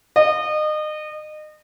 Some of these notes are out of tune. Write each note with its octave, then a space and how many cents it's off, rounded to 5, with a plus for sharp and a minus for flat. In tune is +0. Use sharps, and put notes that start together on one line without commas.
D#5 -30